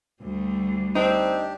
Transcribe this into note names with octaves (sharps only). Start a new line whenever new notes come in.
D2 G3
C4 D4 D#4 G4